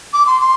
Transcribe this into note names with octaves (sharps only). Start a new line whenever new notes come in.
D6
C6
C6